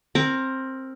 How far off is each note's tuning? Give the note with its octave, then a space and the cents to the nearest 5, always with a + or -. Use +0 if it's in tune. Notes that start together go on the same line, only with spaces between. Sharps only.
C4 +15 A#4 -5